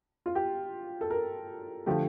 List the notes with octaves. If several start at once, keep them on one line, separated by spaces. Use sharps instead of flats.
F4
G4
A4
A#4
D3 F3 A3 G4